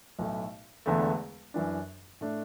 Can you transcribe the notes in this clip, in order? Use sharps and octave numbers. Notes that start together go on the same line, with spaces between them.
B1 A2 A3
E1 E2 D3 A3
F#2 E3 D4
A2 A3 D4